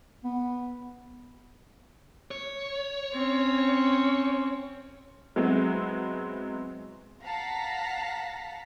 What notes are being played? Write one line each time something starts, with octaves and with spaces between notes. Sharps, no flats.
B3
C#5
C4 C#4
F#3 G#3 B3 C4 E4
F5 F#5 A5 A#5 A#6 B6